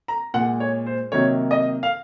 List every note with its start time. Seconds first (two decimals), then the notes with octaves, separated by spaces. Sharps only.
0.08 A#5
0.34 A#2 F#5
0.39 G#3
0.60 C#5
0.86 C5
1.12 C3 D#3 F#3 A#3 C#5
1.51 D#5
1.83 F5